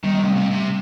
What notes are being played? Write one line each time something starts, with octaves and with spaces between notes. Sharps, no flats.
D#3 G3
G3
C3
A3
C3
C3